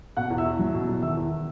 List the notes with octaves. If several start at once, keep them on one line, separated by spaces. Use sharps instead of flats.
B2 F#5 F#6
E2
E5 E6
E2
F#3
B2
E2
D#3 E5 E6
E2